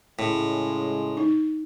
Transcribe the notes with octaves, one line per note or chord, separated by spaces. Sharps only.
A2 C#3 G#3
D#4